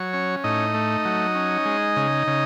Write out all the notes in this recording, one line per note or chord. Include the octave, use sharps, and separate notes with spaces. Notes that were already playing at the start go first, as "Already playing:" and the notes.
Already playing: F#3 C#5
C#4
A2 D#4 D#5
A3
F#3
C#4
G#3
C#3
C#3